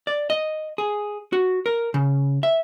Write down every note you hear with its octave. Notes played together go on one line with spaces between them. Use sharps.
D5
D#5
G#4
F#4
A#4
C#3
E5